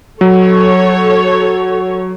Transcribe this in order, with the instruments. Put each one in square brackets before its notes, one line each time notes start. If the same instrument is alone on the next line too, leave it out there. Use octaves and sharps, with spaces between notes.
[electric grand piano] F#3 [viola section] A4 C#5